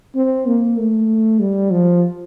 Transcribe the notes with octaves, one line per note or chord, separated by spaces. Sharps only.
C4
A#3
A3
G3
F3